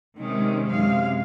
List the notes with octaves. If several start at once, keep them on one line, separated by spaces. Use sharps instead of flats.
C3 D#3 G#3 C#4
F#2 C3 G#3 F5